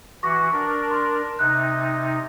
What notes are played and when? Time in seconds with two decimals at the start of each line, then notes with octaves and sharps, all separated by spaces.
0.23 E3 F#4 C#6 D6 A#6
0.52 D4 A#4
0.91 C6
1.39 C3 D#4 F#6